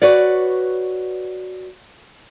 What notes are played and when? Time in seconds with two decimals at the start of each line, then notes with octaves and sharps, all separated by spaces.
0.02 F#4 B4 C#5 D5